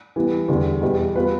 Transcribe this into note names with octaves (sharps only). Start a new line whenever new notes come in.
E3 G3 B3
E2 D3 G3
E2 B2 G3
G3 B3 F4 B4